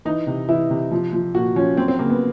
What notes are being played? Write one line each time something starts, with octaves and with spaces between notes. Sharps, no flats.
E3 D#4
C3
E3 E4
C3
F3
F3
A#2 F#4
F3 C#4
F#3 C4
C4
C#3 A#3
B3